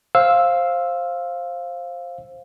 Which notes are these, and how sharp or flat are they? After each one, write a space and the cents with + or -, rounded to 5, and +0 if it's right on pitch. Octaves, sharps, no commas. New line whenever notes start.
C5 +15 F5 +0 E6 +0